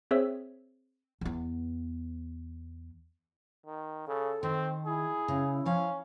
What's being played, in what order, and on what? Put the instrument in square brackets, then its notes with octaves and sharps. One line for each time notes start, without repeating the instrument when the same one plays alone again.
[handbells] C4 G#4 C5 C#5 E5 E6
[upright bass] E2 B3
[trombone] D#3
[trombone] C#3 [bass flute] A4
[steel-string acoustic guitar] D#3 [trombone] C4
[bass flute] E4 [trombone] G#4
[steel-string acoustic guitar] C#3
[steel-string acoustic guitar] F3 F5 [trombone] C#4